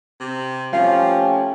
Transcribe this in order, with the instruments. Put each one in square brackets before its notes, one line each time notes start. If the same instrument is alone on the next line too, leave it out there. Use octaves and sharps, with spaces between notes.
[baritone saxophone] C3
[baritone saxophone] F3 [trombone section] A3 C#4 G4 [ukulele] F5